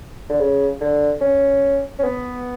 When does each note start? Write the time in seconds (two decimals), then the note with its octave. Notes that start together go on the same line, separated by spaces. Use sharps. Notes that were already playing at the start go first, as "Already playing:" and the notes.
0.29 D3
0.40 C#3
0.81 D3
1.21 C#4
1.99 C#4
2.03 B3